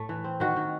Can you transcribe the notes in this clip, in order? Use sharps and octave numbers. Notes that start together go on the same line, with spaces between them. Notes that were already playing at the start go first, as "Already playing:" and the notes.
Already playing: A2 A3
E3
C4
D#3 F#4
D#3